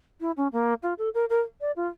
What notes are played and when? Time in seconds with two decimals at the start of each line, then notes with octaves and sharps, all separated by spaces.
0.20 E4
0.37 C#4
0.52 A#3
0.83 F4
0.98 A4
1.14 A#4
1.29 A#4
1.61 D5
1.76 F4